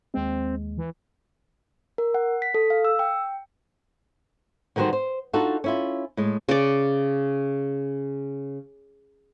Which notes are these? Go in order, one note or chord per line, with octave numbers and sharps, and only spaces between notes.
D#2 G#3 C4
E3
A#4
F#5
B6
A4
F5
E6
G5
D3 D#3 G3 F#4 C5
C5
D4 D#4 F4 F#4 A4
C#4 E4 F4
A2 G#3
C#3 D5